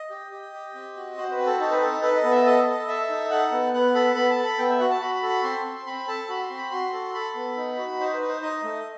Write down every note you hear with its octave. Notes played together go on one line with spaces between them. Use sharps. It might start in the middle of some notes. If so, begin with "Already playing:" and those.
Already playing: D#5
G4
G4
G4
C4
F#4
F#4 C5
B4
C4
A4
D#4 A4
B4
A4
A4 B4
D#5
B3
E5
A4 D#5
A4
A4 E5
D#4
A4 F#5
B3
B3 F#5
A4 B5
B3 B5
A5
A4
B5
B3 G5
E5
F#4 F#5
A5
F#4 B5
B5
A4
B5
C4 C6
C4
C4 B5
A4 A5
F#4 B5
C6
C4
B5
F#4 C6
A4
A4 B5
B3
D#4
F#4
D#4 C5
B4
D#4
C5
D#4 D#5
A3